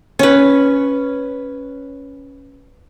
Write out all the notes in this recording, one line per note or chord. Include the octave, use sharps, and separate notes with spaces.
C#4 B4